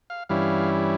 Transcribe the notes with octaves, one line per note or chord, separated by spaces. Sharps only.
F5
G2 E3 G3 C#4 E4 F5